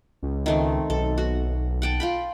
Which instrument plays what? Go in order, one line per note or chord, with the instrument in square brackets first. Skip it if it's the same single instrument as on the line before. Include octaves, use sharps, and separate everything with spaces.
[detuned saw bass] C#2
[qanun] D#3 A3 C4
[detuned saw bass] B1 [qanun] A4
[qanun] F#4
F#5 G5 A5
F4 G5 B5